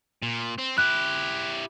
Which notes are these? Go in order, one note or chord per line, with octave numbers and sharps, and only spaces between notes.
A#2
C4
E4 G4 F#6